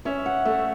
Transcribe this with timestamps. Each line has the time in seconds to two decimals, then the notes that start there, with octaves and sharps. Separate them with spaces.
0.05 C#4 E5
0.26 F#5
0.45 A3 E5